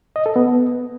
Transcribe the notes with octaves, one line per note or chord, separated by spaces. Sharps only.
D#5
A4
B3